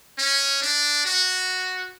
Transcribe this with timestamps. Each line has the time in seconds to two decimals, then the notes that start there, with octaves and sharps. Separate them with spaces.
0.19 C#4
0.62 D4
1.06 F#4